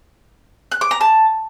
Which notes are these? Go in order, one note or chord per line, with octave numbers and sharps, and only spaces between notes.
F#6
D6
A#5
A5